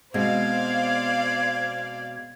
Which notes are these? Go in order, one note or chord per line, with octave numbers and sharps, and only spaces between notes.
B2 G#3 C4 C5 D5 F5 G#6